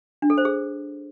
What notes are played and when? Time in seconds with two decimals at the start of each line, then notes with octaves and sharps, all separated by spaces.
0.22 D4
0.30 A4
0.38 C5
0.45 G#4